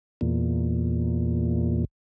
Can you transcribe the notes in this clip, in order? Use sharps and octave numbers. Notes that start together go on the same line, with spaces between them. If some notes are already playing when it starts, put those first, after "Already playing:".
E2 A#2